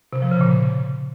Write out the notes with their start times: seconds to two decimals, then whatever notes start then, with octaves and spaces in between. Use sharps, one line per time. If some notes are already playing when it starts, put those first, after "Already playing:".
0.13 C3
0.22 F3
0.31 C#3
0.41 A#2